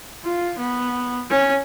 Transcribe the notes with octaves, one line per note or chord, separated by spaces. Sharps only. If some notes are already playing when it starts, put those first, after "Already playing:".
F4
B3
C#4